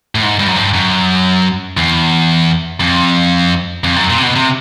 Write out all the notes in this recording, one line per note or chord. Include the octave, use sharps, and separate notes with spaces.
A2
G#2
G2
F#2
G2
F#2
E2
F2
F2
F#2
A#2
C3
B2
C3